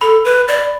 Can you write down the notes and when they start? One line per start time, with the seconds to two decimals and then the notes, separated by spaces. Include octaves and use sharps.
0.01 A4 B5
0.25 B4
0.48 D5